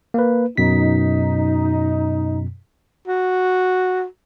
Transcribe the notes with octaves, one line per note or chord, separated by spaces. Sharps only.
A#3 B4
F#2 B2 D#4 B6
F#4